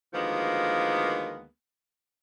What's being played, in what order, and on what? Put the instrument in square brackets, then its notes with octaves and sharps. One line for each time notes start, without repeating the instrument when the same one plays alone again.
[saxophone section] D2 D#3 F3 G#3 A#3 B3